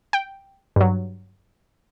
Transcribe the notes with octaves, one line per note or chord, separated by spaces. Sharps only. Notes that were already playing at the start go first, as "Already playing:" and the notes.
G5
G2 F#3